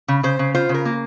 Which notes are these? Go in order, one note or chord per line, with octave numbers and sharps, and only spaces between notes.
C#3
C#3 C5
C#3
F4 C5
C#3
A#4
A#3